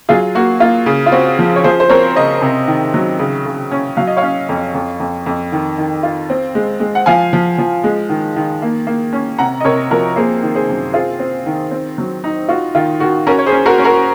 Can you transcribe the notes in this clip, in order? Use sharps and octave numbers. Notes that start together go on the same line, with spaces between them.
F#3 F4 G#4
A#3 F#4
A#3 F4
C#3
F4
C4 F#4
F3
C#5
F3 G#4 C5
C5
C4 A#4 C#5
C#3 C5 D#5
C3
D#3
F#3
C#3
C#3
C#4
F#3 F5
D#5
C#5 F5
C#4
F2
F2
F2
F2
D#3
D#3
F4
C4
G#3
G#3
F#5
F3 F5 G#5
F3
F3
G#3
D#3
D#3
A#3
A#3
C#4
C3 F#5 A#5
D#5
C3 A#4 C#5
F3 F#4 A#4
A#3 G#4 C5
D#3
G#4 C5
F#2
C4 F4 G#4
C4
D#3
C4
F#3
D#4
F4 F#4
D#3 F4
D#3 F#4
C#4 F#4 A#4
C#5
G#4 C5
C#4
F#4 A#4
C#4
F#4 A#4